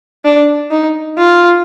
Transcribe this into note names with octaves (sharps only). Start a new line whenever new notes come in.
D4
D#4
F4